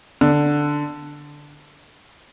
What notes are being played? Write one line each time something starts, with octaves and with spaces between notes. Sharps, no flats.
D3